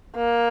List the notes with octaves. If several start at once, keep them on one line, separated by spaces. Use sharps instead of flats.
A#3